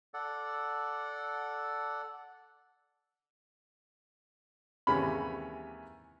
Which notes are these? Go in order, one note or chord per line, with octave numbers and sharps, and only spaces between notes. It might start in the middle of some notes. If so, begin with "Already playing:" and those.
A4 D5 F#5
D#2 C3 E3 G#3 C#4 B5